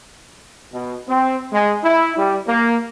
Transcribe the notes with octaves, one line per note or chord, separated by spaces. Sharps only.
B2
C4
G#3
E4
G3
A#3